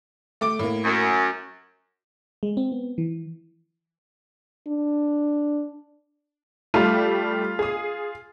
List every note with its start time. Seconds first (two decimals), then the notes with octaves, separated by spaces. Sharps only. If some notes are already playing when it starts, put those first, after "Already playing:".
0.41 A3 D6 D7
0.59 A2 A#3
0.85 F#2
2.43 G#3
2.57 C4
2.72 B3
2.98 E3
4.67 D4
6.74 G3 A3 F4
7.59 G#4 D#6